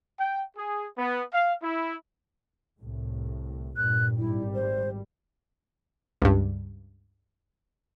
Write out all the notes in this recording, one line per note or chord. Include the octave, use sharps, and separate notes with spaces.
G5
G#4
B3
F5
E4
C2 A2
G2 A#2 F#6
G#1 G3 E4
C5
C#2 G2